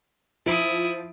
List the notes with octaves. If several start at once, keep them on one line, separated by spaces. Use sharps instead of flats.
F3 E4 D#6 D7